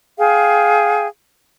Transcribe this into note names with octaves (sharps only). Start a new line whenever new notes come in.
G#4 F5 G5